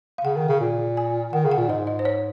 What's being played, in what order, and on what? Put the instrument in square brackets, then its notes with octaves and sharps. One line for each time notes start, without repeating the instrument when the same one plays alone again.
[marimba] F5
[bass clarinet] C#3 [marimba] F#5
[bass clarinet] D#3
C#3
A#2
[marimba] G#5
[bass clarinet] D#3 [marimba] F#5
[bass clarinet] C#3
[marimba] F#5
[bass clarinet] A#2
[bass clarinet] G#2 [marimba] D#5
[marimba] D#5
C5
C#5